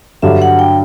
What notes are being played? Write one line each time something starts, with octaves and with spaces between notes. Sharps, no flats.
G2 D3 F#3 E5
F#5
G5